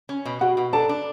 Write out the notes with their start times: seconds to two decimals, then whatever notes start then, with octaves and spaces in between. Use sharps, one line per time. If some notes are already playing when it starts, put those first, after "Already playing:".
0.09 C#4
0.26 B2
0.41 B2 F#4 F#5
0.57 B2
0.73 D4 A4 A5
0.89 D4